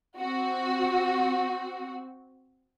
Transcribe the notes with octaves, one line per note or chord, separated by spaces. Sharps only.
C4 F#4